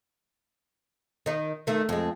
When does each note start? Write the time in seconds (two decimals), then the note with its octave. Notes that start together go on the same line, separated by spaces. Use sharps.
1.26 D#3 D#4
1.67 D#3 A3
1.89 F2 G#3